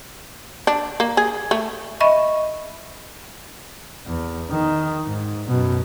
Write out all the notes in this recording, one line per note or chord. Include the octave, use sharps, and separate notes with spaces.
D4
A#3
G#4
A3
D#5 E5 B5 C#6
E2
D#3
G#2
F#2 B2